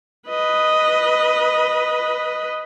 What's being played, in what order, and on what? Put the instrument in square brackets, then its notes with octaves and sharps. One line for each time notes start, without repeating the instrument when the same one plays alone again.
[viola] B4 D#5